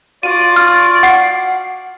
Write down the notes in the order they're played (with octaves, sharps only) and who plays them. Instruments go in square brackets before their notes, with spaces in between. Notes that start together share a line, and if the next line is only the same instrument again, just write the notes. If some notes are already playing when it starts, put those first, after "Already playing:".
[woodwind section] F4 F#4 D5 [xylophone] D#7
[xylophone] F6
F#5 C7